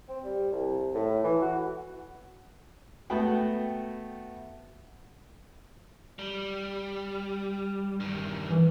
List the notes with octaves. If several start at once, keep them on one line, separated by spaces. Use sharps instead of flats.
C4
G3
C2
A2
E3
F#4
A3 B3 F#4 F#5 G5
G3
G2 D#3
E3